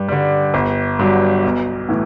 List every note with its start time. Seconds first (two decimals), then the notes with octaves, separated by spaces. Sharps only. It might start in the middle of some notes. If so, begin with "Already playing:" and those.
Already playing: G2
0.08 D3 G3
0.54 G1
0.99 G2 D3 F#3
1.44 B1
1.89 A2 E3